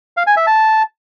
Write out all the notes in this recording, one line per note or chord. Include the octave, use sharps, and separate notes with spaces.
F5
G#5
E5
A5